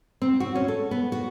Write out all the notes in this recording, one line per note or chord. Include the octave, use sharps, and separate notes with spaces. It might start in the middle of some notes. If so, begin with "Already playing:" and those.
C4
F#4
C#4
A4
B3
F#4